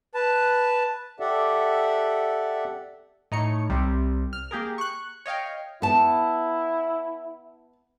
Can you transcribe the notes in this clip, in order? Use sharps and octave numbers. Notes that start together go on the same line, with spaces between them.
B4 A5
G4 A4 D5 E5 F#5
A2 D#4 C#5 C#7
C2 C3 G3
F6
A#3 G4 G#4 A#4
C#6 F#6
C#5 D#5 F5 G5
B3 E4 A5